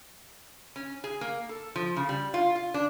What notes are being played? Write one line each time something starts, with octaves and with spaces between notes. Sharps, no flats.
C#4
G#4
A#3
A4
F3
C#3
G3
F4
F4
D4